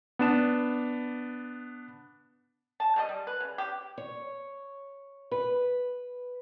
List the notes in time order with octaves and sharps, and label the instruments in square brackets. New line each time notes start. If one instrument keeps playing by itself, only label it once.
[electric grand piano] B3 D4 E7
[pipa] A5
G3 A3 D#5
G3
B4
C#3
G4
[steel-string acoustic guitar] C#5
B4